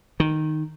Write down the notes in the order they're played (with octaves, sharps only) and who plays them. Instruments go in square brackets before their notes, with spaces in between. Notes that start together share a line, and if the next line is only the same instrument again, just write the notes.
[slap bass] D#3